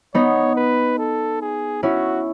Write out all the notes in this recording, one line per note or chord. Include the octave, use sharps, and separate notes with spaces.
B3 D#4 C#5
B4
A4
G#4
C#4 E4 F#4